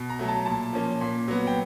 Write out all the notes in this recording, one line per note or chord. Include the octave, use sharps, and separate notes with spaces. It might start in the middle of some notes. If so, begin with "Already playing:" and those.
Already playing: B2
A#5
F#3 A3
A5
A#2 A5
F3 A#3 C#4
A#2
F#3 B3
G5